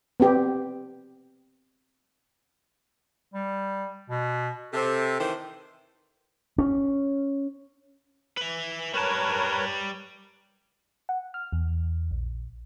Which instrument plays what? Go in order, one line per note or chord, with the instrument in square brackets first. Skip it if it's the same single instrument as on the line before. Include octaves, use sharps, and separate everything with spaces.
[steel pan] B3 C4 G4
[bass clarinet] G3
B2
[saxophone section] C3 [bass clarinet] A4
[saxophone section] D#3 E3 C5
[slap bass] C#4
[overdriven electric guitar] B4 E5
[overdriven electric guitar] G3 A5 [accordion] A#4 B4 C#5
[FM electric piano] F#5
F6
E2
A#1